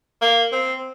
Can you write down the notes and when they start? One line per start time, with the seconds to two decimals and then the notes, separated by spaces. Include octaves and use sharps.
0.22 A#3
0.52 C4